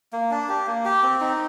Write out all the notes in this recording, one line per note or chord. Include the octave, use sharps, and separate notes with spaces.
A#3
D4
G4
A#3
G4
C4
D#4